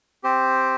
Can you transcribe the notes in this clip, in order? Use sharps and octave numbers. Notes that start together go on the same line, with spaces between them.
C4 G4 C5